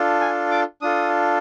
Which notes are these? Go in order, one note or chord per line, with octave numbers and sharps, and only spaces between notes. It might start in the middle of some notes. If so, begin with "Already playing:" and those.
Already playing: D4 F4 A4
G#5
D6
D4 F4 A4 D#6